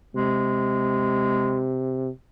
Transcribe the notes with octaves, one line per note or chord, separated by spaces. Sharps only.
C3 G#3